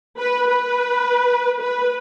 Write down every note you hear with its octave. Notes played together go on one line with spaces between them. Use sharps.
B4
B4
B4